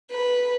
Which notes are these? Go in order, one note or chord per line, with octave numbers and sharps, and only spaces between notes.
B4